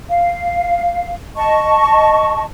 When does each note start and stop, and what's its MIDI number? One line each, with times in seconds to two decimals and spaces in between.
0.09 1.14 77
1.35 2.43 75
1.35 2.43 81
1.35 2.43 85